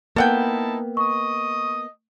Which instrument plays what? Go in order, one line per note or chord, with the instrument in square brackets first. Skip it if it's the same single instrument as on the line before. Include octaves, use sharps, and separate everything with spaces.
[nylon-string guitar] A#3 B3 [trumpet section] D#4 E4 A5 [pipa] A4 F#5 G5
[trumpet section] D#5 D#6 [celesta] C#6